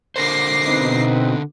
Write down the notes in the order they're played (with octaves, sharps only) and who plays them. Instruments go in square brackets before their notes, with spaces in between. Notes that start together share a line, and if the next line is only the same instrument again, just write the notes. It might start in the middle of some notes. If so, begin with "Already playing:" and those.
[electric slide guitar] D3 A#4 C5 [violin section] D6 A#6 C7
[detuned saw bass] B2 [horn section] C4 D#4 B4